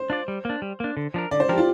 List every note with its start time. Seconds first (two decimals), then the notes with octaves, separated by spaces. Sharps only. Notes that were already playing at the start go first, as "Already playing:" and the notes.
Already playing: C5
0.10 D4 F4 D5
0.28 G3
0.45 A#3 D4
0.62 G3
0.80 A#3 D4
0.97 D3
1.14 F3 D4 A#4
1.31 D3 D5
1.40 C5
1.49 F3 D4 G4 A#4
1.58 F4